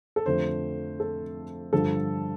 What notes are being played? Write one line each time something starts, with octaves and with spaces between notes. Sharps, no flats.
A4
F2 D3 A3 F4 C5
A4
G2 D3 F3 A4